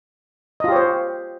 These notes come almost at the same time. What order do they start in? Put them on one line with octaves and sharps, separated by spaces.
D#5 F4 G4 C#5 C5